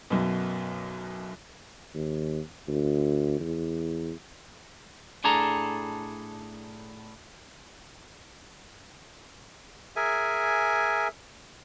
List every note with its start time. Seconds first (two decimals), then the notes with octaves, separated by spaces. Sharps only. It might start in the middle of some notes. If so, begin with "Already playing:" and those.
0.10 B1 F#2 B2
1.95 D#2
2.68 D2
3.40 E2
5.24 A2 D4 G#4 A4 A#5
9.96 G#4 A#4 E5 G#5